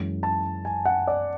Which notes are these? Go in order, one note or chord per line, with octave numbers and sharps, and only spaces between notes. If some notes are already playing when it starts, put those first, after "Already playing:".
Already playing: F#2 E3 G#3
A5
G#5
F#5
D5